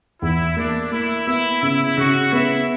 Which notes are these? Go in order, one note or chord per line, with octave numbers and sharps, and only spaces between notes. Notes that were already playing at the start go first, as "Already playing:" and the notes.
E2 E4
A#3 D4
A#3 E4
B3 E4
C#3 E4
C#3 F#4
B3 E4 E5